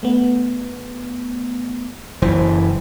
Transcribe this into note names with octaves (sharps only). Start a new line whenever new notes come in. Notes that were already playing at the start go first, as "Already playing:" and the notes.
A3 B3
F#1 E3 C5